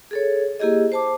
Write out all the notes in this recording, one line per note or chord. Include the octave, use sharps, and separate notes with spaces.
G#4 A4 C#5
A#3 E4 G4 G#4 D#5
C5 A5 D6